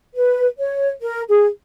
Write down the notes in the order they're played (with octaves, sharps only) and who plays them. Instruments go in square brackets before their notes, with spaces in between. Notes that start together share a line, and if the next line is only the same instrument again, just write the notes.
[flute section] B4
C#5
A#4
G#4